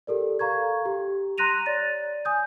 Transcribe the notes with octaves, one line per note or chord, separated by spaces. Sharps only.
G4 A4 A#4 D5
A4 F5 A#5 C#6 G#6
G4
A#5 C6 F#6 A#6 D#7 F7
C#5 D5 A6
G#5 D#6 G6